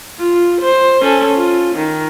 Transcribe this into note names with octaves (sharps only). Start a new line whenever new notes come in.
F4
C5
C#4 A4
F4
D#3